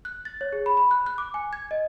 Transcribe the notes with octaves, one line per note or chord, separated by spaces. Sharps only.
F#6
A6
C#5
G#4
B5
B5
F#6
F#6
D6
G#5
G#6
D#5